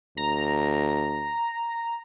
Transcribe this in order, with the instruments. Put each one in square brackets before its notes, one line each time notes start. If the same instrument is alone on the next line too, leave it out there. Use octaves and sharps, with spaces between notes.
[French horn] D2 [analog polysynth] A#5